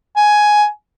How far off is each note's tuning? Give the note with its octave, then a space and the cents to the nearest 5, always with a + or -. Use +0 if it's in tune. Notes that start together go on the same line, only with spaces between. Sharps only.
G#5 +10